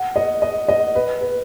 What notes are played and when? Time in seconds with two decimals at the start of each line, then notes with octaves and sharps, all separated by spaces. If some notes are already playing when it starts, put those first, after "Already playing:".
Already playing: F#5
0.16 D#5
0.42 D#5
0.68 D#5
0.95 B4
1.21 B4